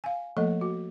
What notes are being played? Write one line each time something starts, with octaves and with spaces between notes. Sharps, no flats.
F5 G#5
F3 A3 A#3 A4 D#5
F#4